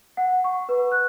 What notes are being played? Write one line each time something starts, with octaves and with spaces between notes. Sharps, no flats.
F#5
C#6
B4
F#6